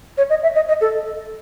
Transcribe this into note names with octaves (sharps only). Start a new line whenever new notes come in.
C#5
D#5
E5
D#5
D#5
A4